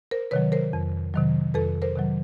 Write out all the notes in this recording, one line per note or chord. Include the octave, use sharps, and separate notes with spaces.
A#4 C5
C3 D#3 F#3 B4 C#5
A#4 C5
F2
C3 D#3 F#3
F2 A4 B4
A#4 C5
C3 D#3 F#3